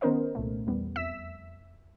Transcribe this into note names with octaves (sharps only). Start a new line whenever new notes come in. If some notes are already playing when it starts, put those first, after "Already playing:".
D#3 B3 C#4 A#4 C5 D#5
C2 A#2 A3
E2 G3 B3
F2 E5 E6 B6 E7